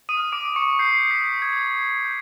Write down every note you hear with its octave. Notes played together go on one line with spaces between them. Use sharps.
D#6 D#7
F6
D6 D7
D6
C#6 C#7
G6 C7
D#6 B6
D#6 G#6
G6
G6